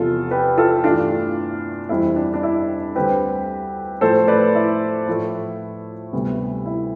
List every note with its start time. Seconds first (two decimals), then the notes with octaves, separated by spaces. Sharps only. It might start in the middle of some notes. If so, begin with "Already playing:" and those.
Already playing: E2 C3 F3 F4 A4
0.31 G4 B4
0.58 F4 A4
0.84 G2 E3 A3 D4 F4
1.89 F2 E3 G3 C4 E4
2.16 D4
2.34 D4
2.43 E4
2.95 D2 D3 G3 C4 G4 B4
4.01 A2 F3 A3 A4 C5
4.28 B4 D5
4.55 E4
5.07 A2 F3 A3
6.13 D2 C3 G3 B3
6.66 E4